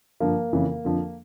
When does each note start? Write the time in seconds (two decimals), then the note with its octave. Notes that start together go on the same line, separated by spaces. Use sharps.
0.20 G2 D3 F3 A#3
0.52 F2 C#3 E3
0.85 F2 D3 F3